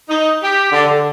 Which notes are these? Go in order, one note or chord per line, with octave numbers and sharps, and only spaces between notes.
D#4
G4
D3
D3